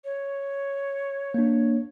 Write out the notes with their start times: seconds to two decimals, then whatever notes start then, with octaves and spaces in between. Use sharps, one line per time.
0.05 C#5
1.34 A#3 D4